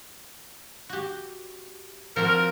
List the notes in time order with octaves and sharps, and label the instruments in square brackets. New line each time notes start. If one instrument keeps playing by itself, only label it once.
[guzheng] F#4 G4
[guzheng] F3 C4 F#4 [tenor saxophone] A#4